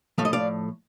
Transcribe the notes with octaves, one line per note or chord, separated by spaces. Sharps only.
A2 F3 A3 F5
D#5
D5 F5